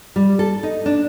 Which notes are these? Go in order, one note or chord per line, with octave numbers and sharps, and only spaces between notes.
G3
A4
D#4
D4